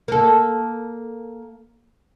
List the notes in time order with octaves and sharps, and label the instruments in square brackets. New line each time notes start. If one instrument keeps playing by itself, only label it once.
[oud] A#3 A4